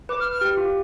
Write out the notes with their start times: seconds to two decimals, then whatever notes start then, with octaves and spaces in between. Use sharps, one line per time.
0.09 B4 D6
0.20 F6
0.31 F6
0.41 G4
0.57 F4